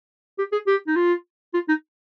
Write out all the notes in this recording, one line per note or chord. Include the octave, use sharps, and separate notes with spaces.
G4
G#4
G4
D#4
F4
F4
D#4